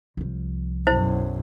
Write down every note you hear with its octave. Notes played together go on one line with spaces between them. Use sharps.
C2 F3
B1 F#2 E4 C5